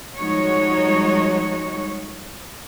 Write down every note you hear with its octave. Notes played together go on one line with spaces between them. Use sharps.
F3 G3 G#3 D#4 F#4 C#5